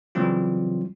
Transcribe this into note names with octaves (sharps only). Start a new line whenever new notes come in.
C#3 E3 F#3 G3 C4 F4